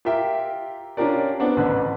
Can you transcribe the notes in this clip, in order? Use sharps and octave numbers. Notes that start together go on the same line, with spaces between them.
F4 G4 A#4 E5 G5
C#4 D4 F4 G4 A#4 D5
B3 C4 D4 D5 F#5
A1 D3 B4